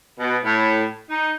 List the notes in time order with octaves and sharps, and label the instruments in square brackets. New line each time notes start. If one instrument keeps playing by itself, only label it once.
[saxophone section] B2
A2
D#4